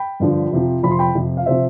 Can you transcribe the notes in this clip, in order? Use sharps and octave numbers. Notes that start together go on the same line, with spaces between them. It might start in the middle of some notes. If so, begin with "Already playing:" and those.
Already playing: G5 B5
G2 D3 F3
F2 C3 F3
F2 C3 F3 B5
C6
G5 B5
F2 C3 F3
F5
C3 F3 C5 E5